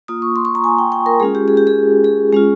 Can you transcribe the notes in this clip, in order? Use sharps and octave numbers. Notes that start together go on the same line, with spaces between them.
A#3 F4 D#6
C#6
C6
C#6
A#5
G#5
G5
G5
A#4
G#3 C#4 F4 G#4
G4
G#4
G4
G#4
G#4
G#3 C#4 F4